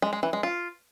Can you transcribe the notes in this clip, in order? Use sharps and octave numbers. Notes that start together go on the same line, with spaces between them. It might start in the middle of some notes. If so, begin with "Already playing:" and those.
G#3
G#3
E3
G#3
F4